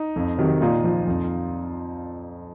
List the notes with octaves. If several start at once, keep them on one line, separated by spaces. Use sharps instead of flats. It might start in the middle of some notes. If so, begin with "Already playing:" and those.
Already playing: D#4
F2
C3 D#3 F#3
A#2 D#4 F4
F3
F2